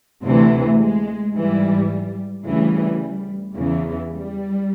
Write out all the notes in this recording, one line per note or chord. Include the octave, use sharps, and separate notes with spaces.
D2 C3 E3 A3
G#3
G#2 E3 G3
D2 C#3 E3 G3
E2 C#3 E3
G3